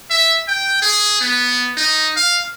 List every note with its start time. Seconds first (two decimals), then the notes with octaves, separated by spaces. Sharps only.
0.10 E5
0.48 G5
0.82 G#4
1.21 B3
1.77 D#4
2.17 F5